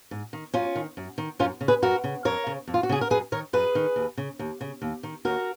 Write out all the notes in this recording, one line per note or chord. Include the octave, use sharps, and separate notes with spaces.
G#2
D#3
F#2 C#4 F4
D#3
F#2
D#3
F#2 C#4 F4
C#3
G#4 B4
F#2 F#4 A#4
C#3
F2 A#4 C#5
C#3
F2
F4
F#4
C#3 G#4
A#4
F#2 G#4 B4
D#3 A#4 C#5
F#2 G#4 B4
D#3
D#2
C#3
D#2
C#3
D#2
D#3
D#2 F#4 A#4